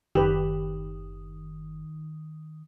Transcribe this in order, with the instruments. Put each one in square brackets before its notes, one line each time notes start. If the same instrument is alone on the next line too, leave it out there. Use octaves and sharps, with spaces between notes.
[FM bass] F#1 [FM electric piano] D#3 [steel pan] G4 B4